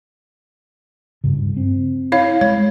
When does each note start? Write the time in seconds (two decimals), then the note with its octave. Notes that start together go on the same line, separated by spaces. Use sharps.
1.24 G2 C#3
1.57 C4
2.12 E4 C#5 F5
2.41 G#3 C#5